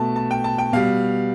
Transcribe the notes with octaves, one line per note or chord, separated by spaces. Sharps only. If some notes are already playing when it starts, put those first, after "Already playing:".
Already playing: B2 A3 A5
A5
G5
A5
G5
B2 G3 F5